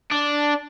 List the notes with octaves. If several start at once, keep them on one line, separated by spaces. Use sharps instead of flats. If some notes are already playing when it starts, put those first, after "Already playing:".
D4